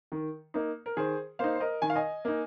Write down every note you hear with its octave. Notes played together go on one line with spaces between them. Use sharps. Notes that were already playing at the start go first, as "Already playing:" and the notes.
D#3
A#3 D#4
A#4
D#3 G#4 C5
A#3 D#4 C5 F5
C5
A#4 D#5
D#3 G#5
F5
D#5 G#5
A#3 D#4